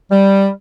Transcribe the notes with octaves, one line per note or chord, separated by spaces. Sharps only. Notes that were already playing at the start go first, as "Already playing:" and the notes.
G3